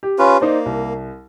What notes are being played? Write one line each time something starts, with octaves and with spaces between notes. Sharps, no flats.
G4
C#4 F4 B4
A#3 D#4 C5 D5
C2